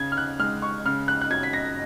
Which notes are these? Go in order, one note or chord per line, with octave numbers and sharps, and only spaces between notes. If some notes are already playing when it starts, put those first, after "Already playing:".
Already playing: C#3 G#6
F6
F#6
G#3 F6
C#6
C#3 F6
F#6
F#6
F#2 G#6
B6
A#6